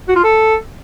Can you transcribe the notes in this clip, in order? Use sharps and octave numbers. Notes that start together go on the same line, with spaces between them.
F#4
F4
A4